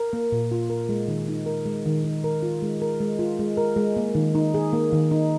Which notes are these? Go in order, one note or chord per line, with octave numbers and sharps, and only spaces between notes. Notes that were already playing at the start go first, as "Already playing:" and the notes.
Already playing: A#4
A#3
A#2
F4
A#4
G#3
D#3
D#4
A#4
G#3
D#3
D#4
A#4
F4
G#3
A#4
G#3
F4
G#3
A#4
G#3
A#3
D#3
D#4
G#4
A#3
D#3
D#4